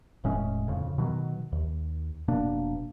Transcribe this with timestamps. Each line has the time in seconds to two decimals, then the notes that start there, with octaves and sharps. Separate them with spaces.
0.24 E1 A2 G#3 C#4
0.67 D1 F2 C#3
0.98 B2 D#3 F#3
1.52 D#2
2.28 F1 B2 A#3 D4